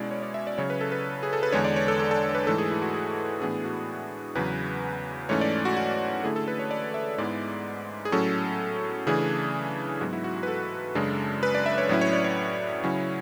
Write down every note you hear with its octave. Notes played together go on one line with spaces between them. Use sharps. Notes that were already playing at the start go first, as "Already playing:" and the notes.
Already playing: B2 G#3 C#4 E4 D5
C#5
D5
E5
D5
C#3 F#3 C#4 C#5
B4
A4
B4
G#4
A4
B4
E2 D3 G#3 D4 C#5
D5
C#5
A4
A4
A4
B4
G#2 E3 A3 A4
G#4
E4
F#4
G#4
A2 E3 B3 D4 G#4
F#4
E2 C#3 F#3 B4
G#2 E3 A3 C#4 C#5
D5
F#4
F#4
D3 A3 E4 G#4
A4
B4
C#5
D5
E5
G#2 G#3 B3 E4 D5
G#4
A2 F#3 C#4 A4
C#3 E3 A3 D4 G#4
G#2 F#3 B3 F#4
E4
F#4
F#4
B4
A4
F#2 C#3 G#3 D4
B4
D5
E5
C#5
A2 F#3 C#4 E4 B4
C#5
D5
C#5
C#3 F#3 C#4 E4